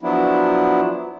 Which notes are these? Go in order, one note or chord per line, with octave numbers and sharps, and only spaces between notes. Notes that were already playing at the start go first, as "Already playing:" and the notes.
F3 F#3 B3 D4 E4